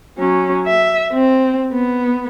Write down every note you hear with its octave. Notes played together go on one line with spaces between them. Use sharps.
F#3 C#4
E5
C4
B3